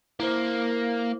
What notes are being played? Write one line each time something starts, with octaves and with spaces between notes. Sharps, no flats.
A#3 E4 C5